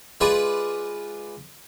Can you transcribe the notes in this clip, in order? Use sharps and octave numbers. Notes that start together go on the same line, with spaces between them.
G#3 F4 G#4 B4 D5